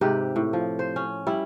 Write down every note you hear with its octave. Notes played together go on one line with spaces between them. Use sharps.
G#2 C3 G4 B4
A2
F3
C5
C#4
G3 E4